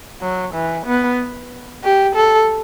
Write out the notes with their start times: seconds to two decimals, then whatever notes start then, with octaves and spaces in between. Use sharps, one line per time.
0.22 F#3
0.54 E3
0.87 B3
1.84 G4
2.16 A4